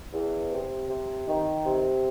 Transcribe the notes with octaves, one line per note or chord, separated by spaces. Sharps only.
E2
C3
C3
D#3
C3